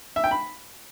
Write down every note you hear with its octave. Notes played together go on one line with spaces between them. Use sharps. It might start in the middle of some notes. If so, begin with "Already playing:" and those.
E5
G5
B5